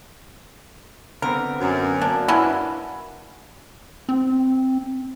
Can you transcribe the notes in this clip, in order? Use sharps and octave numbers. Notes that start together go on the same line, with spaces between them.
D3 B3 C4 A#4
F#2
A#3 D4
F#3 A#3 C#4 D4 E4 B4
C4